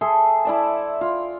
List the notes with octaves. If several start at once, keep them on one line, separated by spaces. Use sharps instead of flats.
G#4 A4 E5 C6
E4 D5 A5
F4